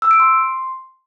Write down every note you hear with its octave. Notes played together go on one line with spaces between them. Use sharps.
E6
D7
C6